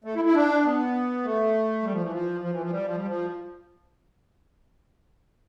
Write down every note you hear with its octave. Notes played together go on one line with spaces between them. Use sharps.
A3
E4
E4
D4
B3
A3
G3
F3
E3
F3
F3
E3
F3
G3
F3
G3
F3